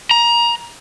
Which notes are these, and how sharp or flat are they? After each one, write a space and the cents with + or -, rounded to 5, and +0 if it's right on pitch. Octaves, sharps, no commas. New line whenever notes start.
A#5 +20